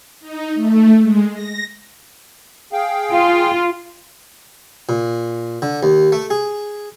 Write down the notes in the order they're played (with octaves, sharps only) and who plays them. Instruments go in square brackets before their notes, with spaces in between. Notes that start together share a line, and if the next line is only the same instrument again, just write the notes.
[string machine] D#4
A3
G#3
A#6
[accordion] G#4 F5 G5
[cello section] F4
[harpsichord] A#2
D3
D#2
A3
G#4